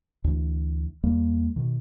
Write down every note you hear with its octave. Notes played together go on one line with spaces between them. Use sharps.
D2 E3
E2 G3 A#3
B2 D#3